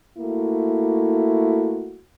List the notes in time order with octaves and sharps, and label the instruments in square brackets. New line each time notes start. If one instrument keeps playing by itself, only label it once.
[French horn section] A3 A#3 E4 F#4